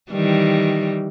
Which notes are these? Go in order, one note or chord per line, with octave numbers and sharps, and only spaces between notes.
D#3 E3 G3